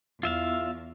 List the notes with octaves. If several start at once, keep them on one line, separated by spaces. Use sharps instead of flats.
E2 F4 E5 F5